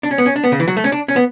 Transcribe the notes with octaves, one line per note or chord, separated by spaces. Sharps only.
D4
C#4
B3
C#4
D4
B3
C#3
E3
F#3
A3
C#4
D4
C#4
B3